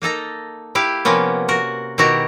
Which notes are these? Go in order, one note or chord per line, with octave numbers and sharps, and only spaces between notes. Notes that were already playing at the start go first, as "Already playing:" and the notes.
A#3 D#4 A4 A#5
E4 G4 F5
C3 F3 A#3 B3 C#4
F#4 A#4
B2 D#3 E4 F#4 G4 A#5